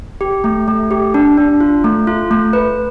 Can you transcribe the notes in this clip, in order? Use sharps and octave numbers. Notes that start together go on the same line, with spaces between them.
G4
A3
A3
G4
D4
D4
F4
A3
F4
A3
B4